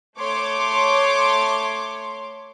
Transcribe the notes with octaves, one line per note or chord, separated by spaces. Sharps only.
A3 C#5 C6 D6